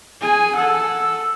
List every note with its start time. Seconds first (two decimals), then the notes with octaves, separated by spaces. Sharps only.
0.21 G#4 G#5
0.56 A4 F#5 E6